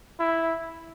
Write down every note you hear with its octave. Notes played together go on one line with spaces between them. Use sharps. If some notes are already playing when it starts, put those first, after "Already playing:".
E4